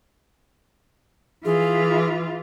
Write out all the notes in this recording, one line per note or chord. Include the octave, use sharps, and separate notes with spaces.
E3 F4 G#4